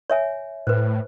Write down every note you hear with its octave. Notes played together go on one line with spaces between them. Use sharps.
C#5 E5 G#5
A2 B4 C5